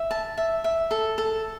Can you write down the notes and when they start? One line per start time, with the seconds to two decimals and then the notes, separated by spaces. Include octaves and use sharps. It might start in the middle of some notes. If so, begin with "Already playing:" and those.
Already playing: E5
0.11 A5
0.37 E5
0.64 E5
0.91 A4
1.18 A4